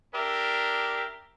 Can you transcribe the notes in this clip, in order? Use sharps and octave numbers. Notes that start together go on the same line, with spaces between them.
D4 G4 A#4 E5